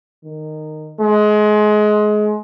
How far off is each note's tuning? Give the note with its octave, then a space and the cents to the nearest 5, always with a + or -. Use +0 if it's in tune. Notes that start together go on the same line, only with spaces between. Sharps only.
D#3 -15
G#3 +25